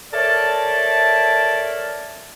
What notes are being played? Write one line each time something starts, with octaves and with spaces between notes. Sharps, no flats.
A4 A#4 C#5 D5 E5 A5